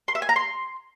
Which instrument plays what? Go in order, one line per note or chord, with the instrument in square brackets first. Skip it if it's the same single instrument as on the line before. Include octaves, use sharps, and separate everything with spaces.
[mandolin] C6
E5
G#5
A#5
C6